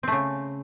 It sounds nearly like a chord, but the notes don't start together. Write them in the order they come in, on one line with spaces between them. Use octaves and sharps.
C4 A3 C#3